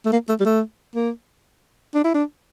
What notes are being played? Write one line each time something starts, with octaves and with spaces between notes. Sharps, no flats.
A3
A#3
A3
G3
A3
A#3
D4
E4
D4